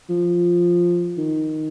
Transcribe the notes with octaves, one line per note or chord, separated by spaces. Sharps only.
F3
D#3